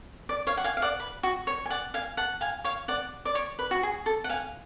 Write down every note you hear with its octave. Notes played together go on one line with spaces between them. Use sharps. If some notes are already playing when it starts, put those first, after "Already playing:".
D5
C#5 F5
F#5
F5 G#5
F5
D5 F#5
B4
F#4
C#5
G#5
D5 F#5
F5 G#5
F#5 A5
F5 G#5
C#5 F5
D5 F#5
D5
C#5
B4
F#4
G#4
A4
F#5
F5 G#5